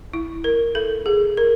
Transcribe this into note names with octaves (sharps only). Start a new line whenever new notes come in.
E4
A#4
A4
G#4
A#4